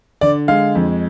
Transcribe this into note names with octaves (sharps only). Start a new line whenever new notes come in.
D3 D5
G#3 F5
F2